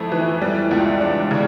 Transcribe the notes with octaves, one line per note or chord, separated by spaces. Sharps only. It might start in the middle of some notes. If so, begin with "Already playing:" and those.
Already playing: F2 A3 E4
E3
G3
C#2
D4
C#3